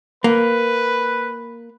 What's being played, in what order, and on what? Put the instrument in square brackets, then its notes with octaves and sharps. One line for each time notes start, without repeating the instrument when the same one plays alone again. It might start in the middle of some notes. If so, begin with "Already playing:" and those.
[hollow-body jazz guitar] A#3 [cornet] B4